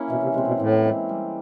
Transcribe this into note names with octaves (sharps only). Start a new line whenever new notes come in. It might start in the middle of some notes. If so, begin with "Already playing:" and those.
Already playing: A#3 C#4 E4
B2 E3
C3
C3 G#3 C4
B2
A2 E3
G#3 C4
G3